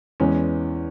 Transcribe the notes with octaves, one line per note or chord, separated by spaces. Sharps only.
E2 E3 G#3 C#4